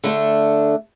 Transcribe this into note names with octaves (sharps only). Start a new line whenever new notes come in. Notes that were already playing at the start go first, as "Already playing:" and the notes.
D3 A3 D4